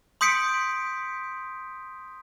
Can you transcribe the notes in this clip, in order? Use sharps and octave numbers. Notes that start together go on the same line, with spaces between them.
C6 D#6 G6 B6 C#7 D7